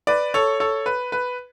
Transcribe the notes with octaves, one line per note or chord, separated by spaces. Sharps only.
B4 D5
A4 C#5
A4 C#5
B4
B4